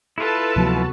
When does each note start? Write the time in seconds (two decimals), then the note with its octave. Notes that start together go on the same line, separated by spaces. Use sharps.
0.18 E4 F4 A4 B4 A5
0.56 D2 C3 F3 F#3 B3 F#4